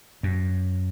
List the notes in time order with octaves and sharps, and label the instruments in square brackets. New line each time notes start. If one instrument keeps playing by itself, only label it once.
[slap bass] F#2